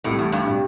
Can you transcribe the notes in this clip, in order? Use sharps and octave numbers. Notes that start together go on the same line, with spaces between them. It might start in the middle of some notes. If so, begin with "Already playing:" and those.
C2 A2 C3 A3 E4
E2
G2
C3 G3